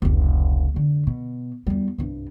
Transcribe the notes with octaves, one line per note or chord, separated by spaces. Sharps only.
F1 C#2
F1 D3
B2
E2 G3
C2 G2